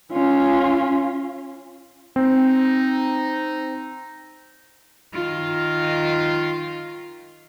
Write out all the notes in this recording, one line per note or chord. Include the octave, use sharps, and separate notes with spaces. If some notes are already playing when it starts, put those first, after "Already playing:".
C#4 F4
C4 D#4
D#3 F4